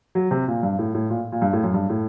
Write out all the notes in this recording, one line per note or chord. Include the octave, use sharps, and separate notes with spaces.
F#3
C3
A#2
G2
A2
A2
A#2
A#2
G2
A2
F#2
G2
A2